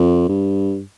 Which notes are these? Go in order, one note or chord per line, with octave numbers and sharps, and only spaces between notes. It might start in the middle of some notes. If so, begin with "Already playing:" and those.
Already playing: F2
G2